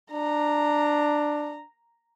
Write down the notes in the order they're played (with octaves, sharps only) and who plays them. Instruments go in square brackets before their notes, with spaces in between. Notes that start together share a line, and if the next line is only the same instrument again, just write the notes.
[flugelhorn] D4 [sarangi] A#5